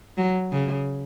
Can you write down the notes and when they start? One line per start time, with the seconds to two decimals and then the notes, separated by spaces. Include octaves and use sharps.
0.18 F#3
0.52 C#3